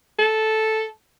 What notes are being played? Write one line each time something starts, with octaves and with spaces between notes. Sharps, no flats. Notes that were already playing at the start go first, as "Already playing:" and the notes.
A4